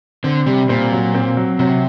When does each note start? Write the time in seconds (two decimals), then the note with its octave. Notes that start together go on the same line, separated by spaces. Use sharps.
0.24 D3 C4
0.46 C3 G3
0.69 A#2 C4
0.92 F#3
1.14 C4
1.37 F#3
1.59 C3 F#3